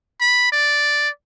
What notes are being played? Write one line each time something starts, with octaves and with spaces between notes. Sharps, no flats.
B5
D5